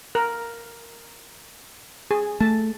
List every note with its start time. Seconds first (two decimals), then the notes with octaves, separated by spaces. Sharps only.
0.15 A#4
2.11 G#4
2.40 A3 A5